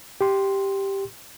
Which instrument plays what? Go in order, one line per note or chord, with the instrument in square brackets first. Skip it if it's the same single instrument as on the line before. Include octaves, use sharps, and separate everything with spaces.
[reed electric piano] G4 C6